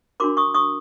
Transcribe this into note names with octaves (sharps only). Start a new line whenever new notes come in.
D4 F#4 A#4 C6 D6
C#6 D#6
C#6 D#6